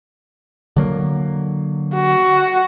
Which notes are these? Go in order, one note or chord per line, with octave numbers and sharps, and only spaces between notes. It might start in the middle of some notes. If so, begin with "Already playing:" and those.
D3 F#3 A#3
F#4